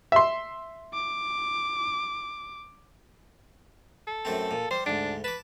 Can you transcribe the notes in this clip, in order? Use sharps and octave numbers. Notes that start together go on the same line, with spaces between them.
E5 C6
D6
A4
F#2 A3 C4
A#2
G3 C5
D2 G#2 D4
B4 A5 D6